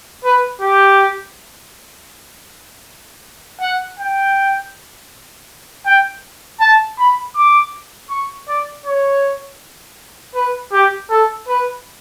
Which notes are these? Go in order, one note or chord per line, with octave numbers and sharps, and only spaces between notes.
B4
G4
F#5
G5
G5
A5
B5
D6
C#6
D5
C#5
B4
G4
A4
B4